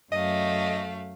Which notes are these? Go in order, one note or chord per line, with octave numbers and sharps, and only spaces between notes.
F#2 A3 D#5 F5